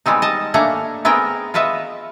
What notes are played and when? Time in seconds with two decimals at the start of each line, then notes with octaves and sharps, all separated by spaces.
0.06 G3 G#3 B3 C4 D#4
0.22 D#5 A5
0.54 A3 A#3 D4 F#5 G#5 A#5
1.05 B3 C4 G#4 A#4 G5
1.54 F4 F#4 B4 D#5 E5